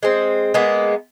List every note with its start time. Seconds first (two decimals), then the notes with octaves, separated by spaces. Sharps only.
0.03 G#3 C4
0.54 G#3 A#3 B3